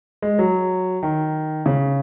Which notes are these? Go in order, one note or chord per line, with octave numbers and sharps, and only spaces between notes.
G#3
F#3
D#3
C#3